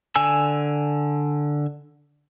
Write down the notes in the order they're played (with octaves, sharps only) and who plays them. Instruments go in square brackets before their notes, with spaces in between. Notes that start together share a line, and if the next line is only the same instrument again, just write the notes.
[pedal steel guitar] D3 G#5 E6